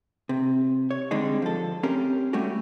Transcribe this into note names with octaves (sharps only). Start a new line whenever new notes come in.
C3
C#5
D3 G3 G#3 C4 D4 D#4
F3 A4
C4 C#4 G4 A#4
G3 A3 C#4 F#4 G4